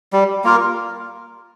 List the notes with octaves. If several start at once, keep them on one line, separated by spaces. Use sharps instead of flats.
G3
A#3 F4 A#4